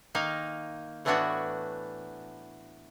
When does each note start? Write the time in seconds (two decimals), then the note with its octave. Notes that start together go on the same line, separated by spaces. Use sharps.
0.15 D#3 A#3 D#4 F5
1.05 A2 E3 A3 B3 D4 F#4